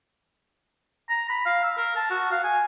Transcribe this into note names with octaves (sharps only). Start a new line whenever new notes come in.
A#5
B5
F5
E6
A#4
A5
F#4
F5
G#5